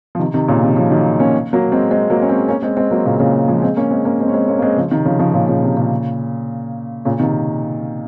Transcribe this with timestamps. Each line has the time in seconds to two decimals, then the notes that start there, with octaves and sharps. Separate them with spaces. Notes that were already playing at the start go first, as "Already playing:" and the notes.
0.15 F3
0.19 C3 D#3
0.34 C3 D#3
0.48 A#2 C#3
0.63 C3 D#3
0.77 C#3 F3
0.91 D#3 F#3
1.19 A#3 C#4
1.53 F#3 A#3
1.72 G#3 C4
1.91 G#3 C4
2.10 F#3 A#3
2.22 C#4
2.29 G#3 C4
2.48 A#3 C#4
2.62 G#3 C4
2.77 G#3 C4
2.91 F#3 A#3
3.05 A#2 C#3
3.20 A#2 C#3
3.48 F3 G#3
3.62 G#3 C4
3.77 A#3 C#4
3.91 G#3 C4
4.05 A#3 C#4
4.20 G#3 C4
4.28 C#4
4.34 G#3 C4
4.48 A#3 C#4
4.58 A#3
4.62 G#3 C4
4.77 C#3 F3
4.91 C3 D#3
5.05 C#3 F3
5.19 C#3 F3
5.34 A#2 C#3
5.48 A#2 C#3
5.63 C3
5.77 A#2 C#3
7.05 A#2 C#3
7.20 C3 D#3